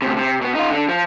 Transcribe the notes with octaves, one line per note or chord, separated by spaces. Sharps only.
D2 C3
C3
B2 B3
D#4 F4
D3 D4
F3